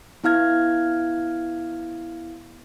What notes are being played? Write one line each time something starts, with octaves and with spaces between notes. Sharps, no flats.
B3 E4 F5 F6 G#6